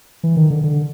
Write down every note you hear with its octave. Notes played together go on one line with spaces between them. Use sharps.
E3
D#3
D3
D3